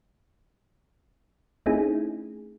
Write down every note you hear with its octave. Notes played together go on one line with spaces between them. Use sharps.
A3 C4 C#4 D#4 E4 G#4